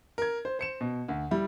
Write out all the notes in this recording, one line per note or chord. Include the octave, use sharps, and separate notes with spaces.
A#4 G#6
C5
C5 C#7 E7
B2
D2
G3 E4